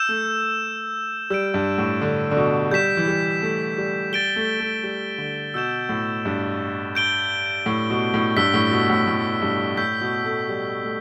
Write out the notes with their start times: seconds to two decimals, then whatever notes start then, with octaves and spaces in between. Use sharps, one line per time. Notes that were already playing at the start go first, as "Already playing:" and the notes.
Already playing: E6 G6 E7
0.09 A3
1.30 G3 E6 G6 D7
1.54 G2
1.78 A2
2.01 D3
2.31 D3
2.37 B2
2.71 G3 G6 B6 E7
2.97 E3
3.07 G3
3.42 A3
3.78 G3
4.12 G3 A6 D7 G7
4.36 A3
4.60 A3
4.83 G3
5.18 D3
5.54 B2 E6 G6 E7
5.89 A2
6.25 G2
6.95 G6 D7 G7
7.66 A2
7.90 B2
8.14 A2
8.37 G2 E6 B6 G7
8.54 A2
8.71 B2
8.90 A2
9.07 A2
9.42 G2
9.77 A2 E6 G6 B6
10.01 B2
10.25 A3
10.49 G3
10.84 A3